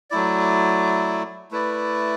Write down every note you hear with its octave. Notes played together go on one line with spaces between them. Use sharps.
F#3 A3 E4 D5
A3 E4 B4 D5